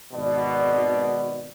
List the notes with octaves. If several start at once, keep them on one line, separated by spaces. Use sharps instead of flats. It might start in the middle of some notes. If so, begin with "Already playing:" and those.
G#1 B2 D5